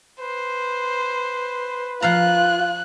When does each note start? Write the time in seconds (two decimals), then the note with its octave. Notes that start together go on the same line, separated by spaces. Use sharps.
0.20 B4 C5
2.02 F3 F4 F5 A#5 F#6